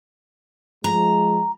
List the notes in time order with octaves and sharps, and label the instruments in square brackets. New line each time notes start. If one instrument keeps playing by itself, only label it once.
[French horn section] F3 G#3 [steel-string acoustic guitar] A#5